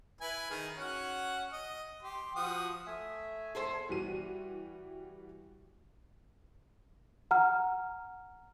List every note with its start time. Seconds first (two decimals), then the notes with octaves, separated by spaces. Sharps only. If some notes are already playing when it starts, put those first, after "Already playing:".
0.21 E4 B4 G#5
0.50 D#3 G#4
0.78 C#4 F#4 F#5
1.52 D#5
2.03 G4 C6
2.36 F3 F#4 D#6
2.86 A3 E5 G#5
3.55 E2 G#2 G#4 A4 C5
3.89 E3 G3 F#4 D#7
7.31 F#5 A#5 F6